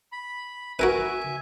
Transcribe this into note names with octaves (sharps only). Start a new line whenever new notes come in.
B5
F#4 A#4 B4 E5 G#5